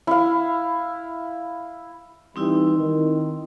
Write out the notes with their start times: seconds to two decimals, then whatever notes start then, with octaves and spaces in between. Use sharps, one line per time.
0.07 E4 F5
2.36 E3 G3 C4 D#4 E4
2.77 D#3